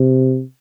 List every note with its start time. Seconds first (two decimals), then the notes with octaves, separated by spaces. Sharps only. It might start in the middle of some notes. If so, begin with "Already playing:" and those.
Already playing: C3